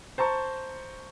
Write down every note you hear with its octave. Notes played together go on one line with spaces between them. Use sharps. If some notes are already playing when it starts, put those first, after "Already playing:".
C5 A5 A#5 C#6